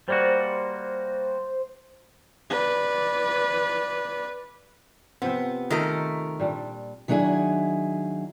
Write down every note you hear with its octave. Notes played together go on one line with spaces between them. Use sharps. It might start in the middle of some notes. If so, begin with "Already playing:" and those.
G3 A#3 F#4 C5
B4 D5
C3 F3 B3 C4
D#3 A3 F4 A#4 G5
A#2 G3 D4
D#3 F#3 D4 E4 G#4